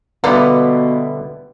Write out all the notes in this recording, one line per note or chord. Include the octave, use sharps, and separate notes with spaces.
B2 D3 G3 A#3 B3 D#4 B4 E5